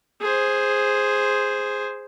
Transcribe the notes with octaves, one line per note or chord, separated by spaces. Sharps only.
G#4 C5